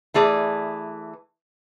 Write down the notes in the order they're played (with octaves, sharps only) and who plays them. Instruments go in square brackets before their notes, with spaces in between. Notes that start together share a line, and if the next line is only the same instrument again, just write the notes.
[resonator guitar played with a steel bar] E3 A3 G#4 B4 D5